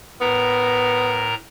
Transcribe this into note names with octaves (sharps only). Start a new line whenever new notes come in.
A2 B3 A#4 A#5